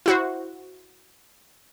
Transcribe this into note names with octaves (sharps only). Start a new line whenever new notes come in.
E4 F#4 C5